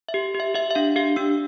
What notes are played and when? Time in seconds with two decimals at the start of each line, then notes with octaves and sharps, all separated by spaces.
0.09 E5
0.14 G4
0.35 G4
0.40 E5
0.54 G4 E5
0.71 E5
0.75 D4 F5
0.96 G4 F5
1.16 D4 E6